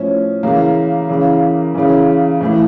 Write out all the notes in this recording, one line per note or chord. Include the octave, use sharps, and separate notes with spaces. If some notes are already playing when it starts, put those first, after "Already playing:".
Already playing: A2 F3 C#4
C#3 E3 A#3
C#3 E3
C#3 E3
A2 E3